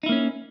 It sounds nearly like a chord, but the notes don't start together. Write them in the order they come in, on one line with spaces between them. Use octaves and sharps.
D#4 E4 A#3 C#4